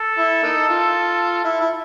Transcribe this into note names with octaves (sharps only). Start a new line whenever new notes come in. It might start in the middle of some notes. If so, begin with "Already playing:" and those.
Already playing: A4
E4
A#3 D#4
F4
E4
E4